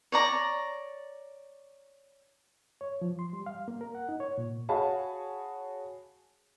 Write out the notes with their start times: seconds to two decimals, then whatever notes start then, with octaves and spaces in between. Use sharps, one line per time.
0.12 C#5 D5 A#5
2.81 C#5
3.02 F3
3.19 C6
3.33 G3
3.46 F5
3.68 A#3
3.81 A#4
3.95 F#5
4.09 D#4
4.20 C#5
4.38 A#2
4.69 F#4 G#4 C#5 F5 A5 B5